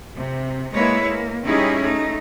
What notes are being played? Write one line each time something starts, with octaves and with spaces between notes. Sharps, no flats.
C3
G#3 A#3 E4 B4 C#5
A#3
G3 C#4 D#4 E4 G4 G#4
A3 D#4